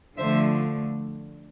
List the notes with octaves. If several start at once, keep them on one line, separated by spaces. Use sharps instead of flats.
D3 F3 A3 C5 E5